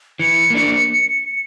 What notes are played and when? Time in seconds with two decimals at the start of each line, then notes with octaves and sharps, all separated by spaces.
0.19 E3 C#7
0.50 A#3 D4